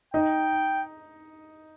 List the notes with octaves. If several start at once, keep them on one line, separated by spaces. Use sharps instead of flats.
D#4 D#5 G5